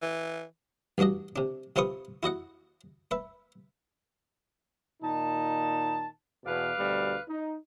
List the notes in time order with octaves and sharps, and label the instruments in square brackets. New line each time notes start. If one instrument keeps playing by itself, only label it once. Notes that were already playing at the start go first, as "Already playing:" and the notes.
[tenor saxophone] E3
[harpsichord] A1 G2 D4 F#4 D#5
C3 D4
C3 C4 F4 B4 C#6 D#6
E4 F#4 D#5 F#5
B4 E5
[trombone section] A#2 D#3 D#4 [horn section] A5
[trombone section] E2 B2 [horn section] B4 D5 F5
[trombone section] D2 B2 G3
D#4